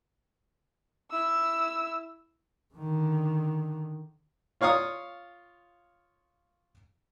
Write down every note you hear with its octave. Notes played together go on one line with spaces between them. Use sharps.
E4 E6
D3 D#3
F4 C#5 F5 C#6 D#6